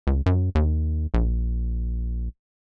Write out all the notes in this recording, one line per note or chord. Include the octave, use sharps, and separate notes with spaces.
C#2
F#2
D#2
A#1